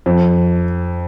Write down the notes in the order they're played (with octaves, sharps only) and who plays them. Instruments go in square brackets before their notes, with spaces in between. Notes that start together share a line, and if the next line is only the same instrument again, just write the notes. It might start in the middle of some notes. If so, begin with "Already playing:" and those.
[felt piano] F2